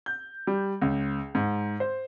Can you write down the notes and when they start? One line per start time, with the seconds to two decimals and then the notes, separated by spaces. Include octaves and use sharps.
0.06 G6
0.47 G3
0.82 C#2
1.35 G#2
1.80 C5